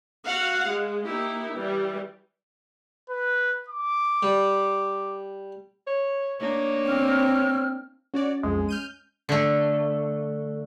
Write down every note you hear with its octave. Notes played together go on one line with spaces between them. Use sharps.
F#4 F5 F#5
G#3
A#3 D#4 E4 G4
E3 G3
B4
D6
G3
C#5
A#3 D4 D#4 C#5
C4 F6
C#4 F#4 C#5 D5
B1 F2 G#3
F6 G6 D#7
D3 A3